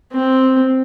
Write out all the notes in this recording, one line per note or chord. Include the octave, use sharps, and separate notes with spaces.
C4